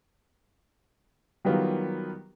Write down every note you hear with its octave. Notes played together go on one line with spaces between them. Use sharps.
D#3 F#3 G3 B3 F4 A#4